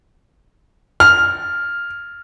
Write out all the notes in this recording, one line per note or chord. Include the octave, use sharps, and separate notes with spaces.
F6